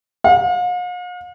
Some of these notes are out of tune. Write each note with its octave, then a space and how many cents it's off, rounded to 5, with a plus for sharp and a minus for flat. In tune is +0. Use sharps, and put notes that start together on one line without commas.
F5 +45